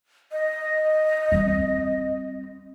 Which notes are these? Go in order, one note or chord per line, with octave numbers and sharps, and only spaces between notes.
D#5
G3 C4